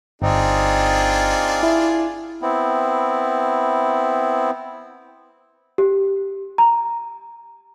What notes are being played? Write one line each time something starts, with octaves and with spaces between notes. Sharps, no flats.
G1 C4 D4 D#4 F4 G#4
E4
B3 C4 E4
G4
A#5